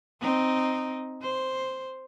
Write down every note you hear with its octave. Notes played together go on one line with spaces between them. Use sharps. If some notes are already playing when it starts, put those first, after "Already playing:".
C4 D#4
C5